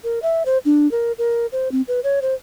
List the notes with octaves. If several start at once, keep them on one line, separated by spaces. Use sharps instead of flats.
A#4
E5
C5
D4
A#4
A#4
C5
C4
B4
C#5
C5